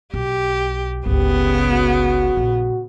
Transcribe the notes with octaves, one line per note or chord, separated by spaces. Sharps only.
B1 G4
G1 C#2 C#3 B3 G4
F#4
A#1